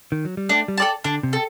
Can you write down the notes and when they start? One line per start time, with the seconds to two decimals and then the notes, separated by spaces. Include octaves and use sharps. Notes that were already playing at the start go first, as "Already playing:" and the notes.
0.12 D#3
0.25 F#3
0.37 G3
0.49 A3 D4
0.68 G3
0.77 A4 D5 A5
1.04 D3 D4
1.23 C3
1.33 A4